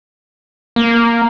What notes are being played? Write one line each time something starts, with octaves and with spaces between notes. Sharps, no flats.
A#3